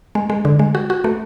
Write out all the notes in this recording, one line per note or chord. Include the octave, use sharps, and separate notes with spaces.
G#3
G#3
D3
G#3
F#4
F#4
A3